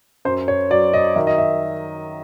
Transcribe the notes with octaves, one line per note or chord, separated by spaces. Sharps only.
F#2 C5
C#5
F#3 D5
D#5
D#3 E5
D#5
E5